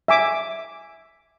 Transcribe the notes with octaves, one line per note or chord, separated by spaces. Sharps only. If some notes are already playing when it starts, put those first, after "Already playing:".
E5 G#5 D6